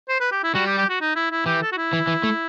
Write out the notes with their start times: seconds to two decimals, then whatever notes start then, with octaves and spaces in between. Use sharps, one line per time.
0.09 C5
0.20 B4
0.32 G4
0.43 E4
0.54 G3 F#4
0.66 G4
0.78 G4
0.89 F#4
1.01 D#4
1.15 E4
1.31 E4
1.46 E3 G4
1.62 A4
1.72 F#4
1.77 E4
1.93 E3
2.07 E3
2.23 A3